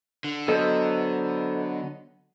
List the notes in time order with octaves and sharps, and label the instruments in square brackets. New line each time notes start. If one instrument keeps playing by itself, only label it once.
[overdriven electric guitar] D3
[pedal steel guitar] F#3 B3 D#5 [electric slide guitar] A4 C5